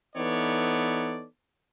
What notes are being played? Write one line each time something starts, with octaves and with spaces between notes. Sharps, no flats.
E3 B3 D#4 A4 C#5 D5